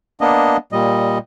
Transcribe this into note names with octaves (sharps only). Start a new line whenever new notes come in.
A#3 B3 D4 D#5
A#2 G3 D#5